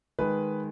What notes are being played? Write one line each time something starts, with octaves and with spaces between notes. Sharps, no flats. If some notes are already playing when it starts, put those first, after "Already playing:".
D#3 G#3 B4